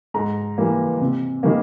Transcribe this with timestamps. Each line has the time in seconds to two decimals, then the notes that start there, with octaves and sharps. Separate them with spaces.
0.14 G#2 A#5
0.58 E3 G3 A#3
1.01 C3
1.43 D#3 G3 A#3